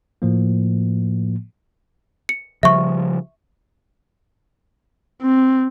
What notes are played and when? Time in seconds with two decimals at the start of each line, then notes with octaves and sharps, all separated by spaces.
0.22 A2 F3 A#3
2.29 C#7
2.63 C#3 F3 G3 E5 C#6
5.22 C4